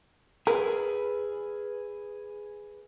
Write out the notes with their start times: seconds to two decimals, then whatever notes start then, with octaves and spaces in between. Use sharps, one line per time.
0.47 G#4 A#4 B4